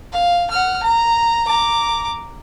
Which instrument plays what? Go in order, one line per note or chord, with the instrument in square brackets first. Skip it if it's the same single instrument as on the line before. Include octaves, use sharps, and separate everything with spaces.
[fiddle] F5
F#5 F6
A#5
A#5 D6